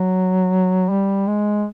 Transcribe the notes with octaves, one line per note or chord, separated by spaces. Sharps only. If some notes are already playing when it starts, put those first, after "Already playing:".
Already playing: F#3
G3
G#3